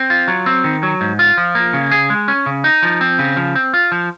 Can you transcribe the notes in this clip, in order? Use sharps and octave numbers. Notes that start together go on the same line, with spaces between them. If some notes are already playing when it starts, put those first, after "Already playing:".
Already playing: C4
F4
F#3
C4
D#3
F#3
G#2
F4
F3
A#3
C#3
G#4
G#3
C#4
C#3
D#4
F3
C4
C#3
F3
C4
F4
F3